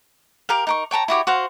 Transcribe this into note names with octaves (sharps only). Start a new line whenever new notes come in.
G4 A#4 F5
D#4 A#4 C#6
C#5 G5 A5 A#5
E4 F#4 G4 C#5
F#4 C5 F5